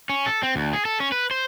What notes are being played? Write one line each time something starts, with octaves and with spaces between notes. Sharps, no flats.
C#4
A4
C4
D2
G#4
A4
C#4
B4
C5